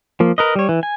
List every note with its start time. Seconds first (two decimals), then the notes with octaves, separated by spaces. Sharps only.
0.20 F3 A#3
0.38 A#4 B4 D#5
0.56 G3 C#5
0.69 E3
0.83 G#5